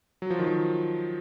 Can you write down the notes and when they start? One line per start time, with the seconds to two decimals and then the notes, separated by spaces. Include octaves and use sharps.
0.22 F#3
0.30 F3
0.39 D#3
0.47 F3